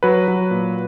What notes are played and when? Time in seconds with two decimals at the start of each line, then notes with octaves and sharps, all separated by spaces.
0.03 F#3 B4
0.28 F#3
0.51 A#2